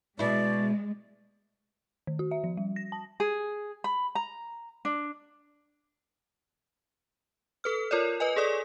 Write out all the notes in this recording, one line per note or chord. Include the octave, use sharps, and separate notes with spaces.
B2 G#3 E4 D5
D#3
F#4
E5
F3
G3
A#6
A5
G#4
B5
A#5
D4
A4 B4 F6
F4 A#4 C#5 D5
B4 D#5 G#5
G#4 A4 D5 D#6